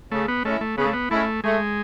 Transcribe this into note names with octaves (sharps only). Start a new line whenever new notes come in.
C#3 A3
B3
G#3 A3 C#4 E4
A3
C#3 B3
A3
B3
G#3 A3 C#4 E4
G#3 A3